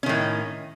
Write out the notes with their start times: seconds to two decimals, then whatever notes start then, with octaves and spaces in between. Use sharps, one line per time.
0.03 C#4
0.06 D#3
0.09 A2